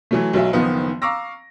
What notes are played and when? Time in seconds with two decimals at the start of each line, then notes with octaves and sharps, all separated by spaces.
0.11 E3 F#3 A3
0.33 B1 F#3 E5
0.53 F#1 D#3 F3 B3 D#4
1.02 F5 A#5 C#6 D6 E6 A#6